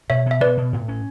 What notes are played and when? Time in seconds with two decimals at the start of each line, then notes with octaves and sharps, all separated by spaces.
0.10 B2 C#5 E5
0.26 B2
0.31 E5
0.41 B2 B4 D5
0.57 B2
0.73 A2
0.88 C#4